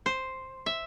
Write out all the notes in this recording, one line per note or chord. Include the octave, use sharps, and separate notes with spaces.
C5
E5